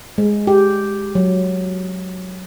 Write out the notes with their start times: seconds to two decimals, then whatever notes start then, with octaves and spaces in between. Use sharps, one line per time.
0.18 G#3
0.47 G4
1.15 F#3